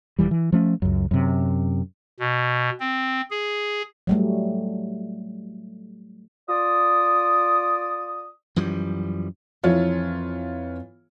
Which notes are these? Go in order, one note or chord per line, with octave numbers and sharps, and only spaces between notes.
E1 D#2 E3 G3
E3
F3 A3 C#4
C#2 F#2
F#2 C3
B2
C4
G#4
F#3 G3 A3
F4 D5 D#6
F#2 E3 F3 G3
F2 E3 F4 C#5